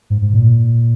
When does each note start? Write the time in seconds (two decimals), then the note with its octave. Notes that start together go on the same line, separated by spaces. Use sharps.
0.10 G#2
0.22 G#2
0.34 A#2